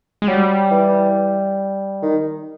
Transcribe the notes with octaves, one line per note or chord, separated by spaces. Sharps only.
G#3
F#3 G3
E3
D#3